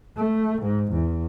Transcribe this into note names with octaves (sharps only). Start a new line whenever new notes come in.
A3
G#2
E2